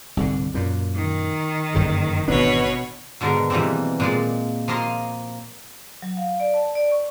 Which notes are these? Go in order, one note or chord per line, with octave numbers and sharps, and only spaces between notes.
C2 G#2 D3
F#2 A#2
D#3
F#1 G2 D3
G#1 B2 E3 D4 B4 C#5
G#2 B2 D3 B3 A#4
B2 E3 G3 A#3 C4
A#2 G#3 D5
F3 A#3 D#5 F5 C6
F#3
F5
D5
A5
D5
C#6